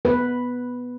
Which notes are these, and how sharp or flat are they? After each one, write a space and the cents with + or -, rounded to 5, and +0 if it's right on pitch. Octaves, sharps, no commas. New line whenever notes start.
B3 +0 B4 +0